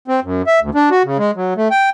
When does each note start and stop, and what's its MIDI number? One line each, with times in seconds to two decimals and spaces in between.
0.08 0.20 60
0.24 0.42 42
0.47 0.60 76
0.61 0.70 38
0.75 0.89 62
0.91 1.03 66
1.05 1.17 49
1.18 1.31 56
1.36 1.54 54
1.57 1.68 57
1.71 1.90 79